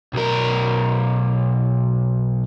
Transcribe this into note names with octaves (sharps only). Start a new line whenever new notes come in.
B1 A#4